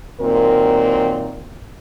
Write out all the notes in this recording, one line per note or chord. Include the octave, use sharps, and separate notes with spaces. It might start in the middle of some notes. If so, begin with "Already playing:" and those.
A#2 D#3 F#3 C4 A#4